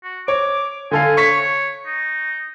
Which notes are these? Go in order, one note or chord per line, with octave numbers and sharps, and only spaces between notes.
F#4
C#5 D6
D3 A4 F5 G#5
C#5 C#6 B6
D#4